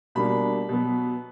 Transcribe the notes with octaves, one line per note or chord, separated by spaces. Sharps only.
B2 G3 A#3 D4 B5
B2 F#3 B3